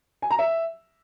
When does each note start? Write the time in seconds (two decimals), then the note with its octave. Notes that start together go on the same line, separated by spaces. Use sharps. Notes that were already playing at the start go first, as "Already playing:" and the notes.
0.22 G#5
0.31 A#5
0.39 E5